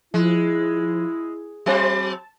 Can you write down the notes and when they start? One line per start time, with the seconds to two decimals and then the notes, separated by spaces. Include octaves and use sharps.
0.14 F3 G#3 E4
1.66 F#3 C4 C5 A5